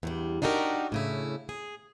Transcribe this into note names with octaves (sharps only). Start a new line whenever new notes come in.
E2 G2 G3
D4 D#4 F#4 G4 A4 A#4
A2 C#3 E4
G#4